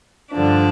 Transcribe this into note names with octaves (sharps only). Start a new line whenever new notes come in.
G2 D3 F3 D4